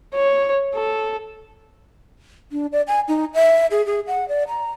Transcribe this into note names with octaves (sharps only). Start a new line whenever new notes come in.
C#5
A4
D4
D5
G#5
D#4
E5
G#4
G#4
F#5
D5
A#5